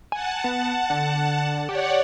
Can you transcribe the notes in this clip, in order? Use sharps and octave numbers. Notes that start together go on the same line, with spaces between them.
F#5 G#5 A5
B3
D3
G4 C#5 D5 F#5